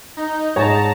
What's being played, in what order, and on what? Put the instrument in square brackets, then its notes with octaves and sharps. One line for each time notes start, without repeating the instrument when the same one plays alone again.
[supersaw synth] D#4
[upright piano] G#2 G#4 C#5 [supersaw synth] A5 A#5